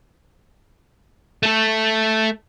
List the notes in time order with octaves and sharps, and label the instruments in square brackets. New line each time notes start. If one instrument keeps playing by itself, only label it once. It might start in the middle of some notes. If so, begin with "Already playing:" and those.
[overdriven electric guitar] A3 A4